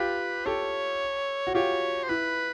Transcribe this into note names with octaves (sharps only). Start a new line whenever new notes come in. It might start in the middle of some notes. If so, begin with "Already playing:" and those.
Already playing: F4 G4 B4
G4 A4 C#5
F#4
F4 G4 C#5
C5
E4 B4